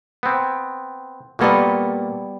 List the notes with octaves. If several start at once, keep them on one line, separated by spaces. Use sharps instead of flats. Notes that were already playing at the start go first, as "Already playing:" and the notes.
B3 C4
A#2 G3 A#3 B3 F#4 A4